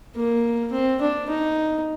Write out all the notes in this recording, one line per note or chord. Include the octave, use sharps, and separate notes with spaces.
A#3
C4
D4
D#4